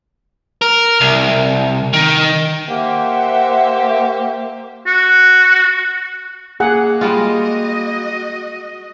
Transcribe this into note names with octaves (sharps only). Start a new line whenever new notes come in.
A#4
C2
D#3
A#3 G4 C5 E5 F#5
F#4
A#3 G#4 F#5
G3 G#3 F4 F#4 D#5